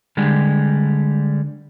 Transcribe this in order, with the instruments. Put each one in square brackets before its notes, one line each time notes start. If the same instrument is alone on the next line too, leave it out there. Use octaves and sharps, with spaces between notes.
[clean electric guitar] D3 G3 G#3 G4